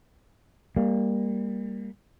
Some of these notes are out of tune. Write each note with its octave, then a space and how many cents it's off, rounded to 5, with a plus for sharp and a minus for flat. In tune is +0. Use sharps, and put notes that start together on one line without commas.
G3 +25 A#3 +0